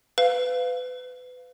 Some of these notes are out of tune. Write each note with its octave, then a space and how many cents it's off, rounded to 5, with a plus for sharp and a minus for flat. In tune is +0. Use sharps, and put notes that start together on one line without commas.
B4 +25 F5 +0